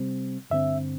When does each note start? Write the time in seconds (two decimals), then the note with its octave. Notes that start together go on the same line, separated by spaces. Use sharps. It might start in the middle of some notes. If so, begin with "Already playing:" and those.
Already playing: C3 G3 C4
0.50 G2 D3 C4 E5